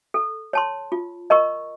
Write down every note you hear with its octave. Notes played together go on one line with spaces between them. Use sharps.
A4
C#5 A5 C6
F4
A#4 D#5 A#5 C#6